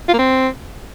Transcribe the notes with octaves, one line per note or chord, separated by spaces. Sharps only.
F4
A#3
C4